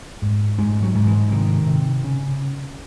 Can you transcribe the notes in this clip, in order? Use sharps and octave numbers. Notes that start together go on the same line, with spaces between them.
G#2
G#2 G#3
F#3
G#2
E3
C3 D#3
C3
C#3